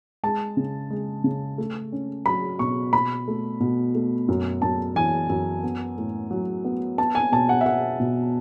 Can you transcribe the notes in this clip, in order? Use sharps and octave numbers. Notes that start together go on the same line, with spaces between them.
G#3 A5
C#3
G#3
C#3
A3
C#4
F#3 B5
B2 C#6
B2 B5
A3
B2
A3
F#2
F#2 A5
E3 G#5
F#2
B3
A2
F#3
B3
B3 A5
G#5
B2 A5
F#5
E5
B3 F#5
B2